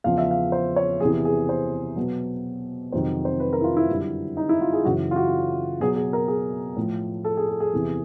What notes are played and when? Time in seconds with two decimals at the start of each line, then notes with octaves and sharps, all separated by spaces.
0.04 E2 C#3 F3 F5
0.18 E5
0.31 F5
0.52 C5
0.76 C#5
1.00 E2 C3 E3 G#4
1.25 G#4
1.49 C5
1.96 B2 F#3
2.92 F2 C3 D#3 F#3 C5
3.25 C5
3.40 B4
3.53 A#4
3.61 E4
3.64 F4
3.77 E4
3.89 F#2 D3 G3
4.37 D#4
4.49 E4
4.61 F4
4.73 G#4
4.84 F#2 C#3 E3 F#4
5.11 F4
5.16 F#4
5.80 B2 F#3 G#4
5.96 G#4
6.13 A#4
6.28 G#4
6.77 A2 F3
7.25 A4
7.37 G#4
7.49 G#4
7.60 G#4
7.73 E2 C3 E3